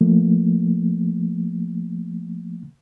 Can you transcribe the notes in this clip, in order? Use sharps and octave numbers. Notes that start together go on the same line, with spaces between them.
F3 A3 A#3